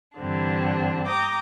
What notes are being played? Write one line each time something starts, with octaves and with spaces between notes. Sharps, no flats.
G2 D3 E3 C4 D4
G5 A#5 D6 D#6